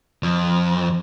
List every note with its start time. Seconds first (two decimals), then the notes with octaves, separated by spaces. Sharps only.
0.23 F2